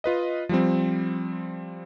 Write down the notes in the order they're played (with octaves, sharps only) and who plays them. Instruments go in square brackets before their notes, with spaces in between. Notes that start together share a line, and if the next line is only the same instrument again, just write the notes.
[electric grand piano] F4 B4 D#5
F3 G3 C4